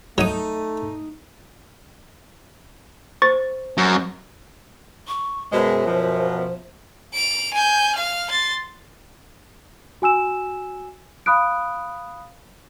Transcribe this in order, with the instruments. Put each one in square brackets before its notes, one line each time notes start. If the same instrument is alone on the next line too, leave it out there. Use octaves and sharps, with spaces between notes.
[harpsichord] F#3 D#6 [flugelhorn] A3 [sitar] D#4
[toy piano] C5 [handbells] C#6 A6
[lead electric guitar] F#2
[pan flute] C#6
[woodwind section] F#2 [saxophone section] B2 G#3 [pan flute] C5
[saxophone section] B2 F3
[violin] D7 F7
G#5 G6
F5 F6
C6 A6
[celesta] F#4 G#5 E6 E7
F5 B5 D#6 F#6 D7